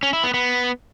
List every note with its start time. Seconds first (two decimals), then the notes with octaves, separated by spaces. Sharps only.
0.03 C#4
0.13 E4
0.24 B3
0.34 B3